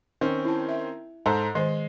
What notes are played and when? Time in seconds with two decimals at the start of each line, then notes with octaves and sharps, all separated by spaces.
0.21 D#3 C4 C#4
0.45 E4 A5
0.68 E5
1.26 G#2 A4 C5
1.55 D#3 G#3 C5